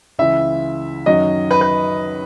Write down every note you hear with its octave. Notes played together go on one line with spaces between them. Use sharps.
C#2 C#3 E3 E5
F#2 D#3 F#3 D#5
B4
B4